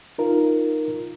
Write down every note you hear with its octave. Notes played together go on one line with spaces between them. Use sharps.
D#4 F4 A#4